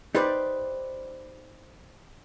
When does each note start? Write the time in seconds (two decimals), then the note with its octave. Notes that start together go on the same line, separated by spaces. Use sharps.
0.15 D#4 G4 B4 C5 D5